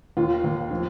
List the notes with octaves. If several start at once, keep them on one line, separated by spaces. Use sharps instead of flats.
D#2 F4
D#2
F3